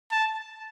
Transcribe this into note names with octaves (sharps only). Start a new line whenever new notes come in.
A5